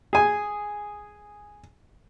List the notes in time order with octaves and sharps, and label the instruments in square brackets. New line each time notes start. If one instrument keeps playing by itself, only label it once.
[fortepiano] G#4 G#5